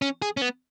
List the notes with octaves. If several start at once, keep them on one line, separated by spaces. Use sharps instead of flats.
C#4
G#4
C#4
B3